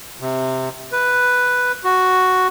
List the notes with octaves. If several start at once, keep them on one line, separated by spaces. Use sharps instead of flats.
C3
B4
F#4